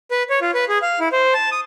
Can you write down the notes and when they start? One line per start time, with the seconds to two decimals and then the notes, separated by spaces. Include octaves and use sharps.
0.11 B4
0.30 C#5
0.41 F4
0.55 B4
0.69 G#4
0.82 F5
1.00 E4
1.12 C5
1.34 A5
1.52 D#6